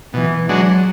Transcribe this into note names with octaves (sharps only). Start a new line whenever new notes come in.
B2 E3
F#3 G#3 D4 F#4